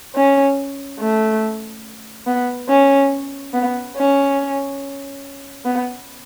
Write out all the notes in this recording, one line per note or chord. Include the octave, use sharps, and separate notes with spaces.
C#4
A3
B3
C#4
B3
C#4
B3